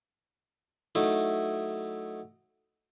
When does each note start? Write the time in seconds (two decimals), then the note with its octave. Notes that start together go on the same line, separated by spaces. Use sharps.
0.95 F#3 A3 D#4 E4